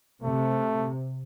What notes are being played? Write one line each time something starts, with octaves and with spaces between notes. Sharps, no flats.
C3 A3